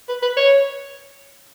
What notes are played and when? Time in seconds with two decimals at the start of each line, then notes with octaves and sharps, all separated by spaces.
0.09 B4
0.23 B4
0.37 C#5